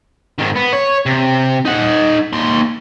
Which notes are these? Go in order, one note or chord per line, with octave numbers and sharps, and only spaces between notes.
G#2 D#3
B3
C#5
C3
D#4 F#5
D#2 C6